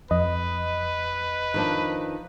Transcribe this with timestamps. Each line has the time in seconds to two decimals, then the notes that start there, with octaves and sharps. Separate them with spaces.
0.11 F2 B4 D#5
1.54 D#3 F3 D4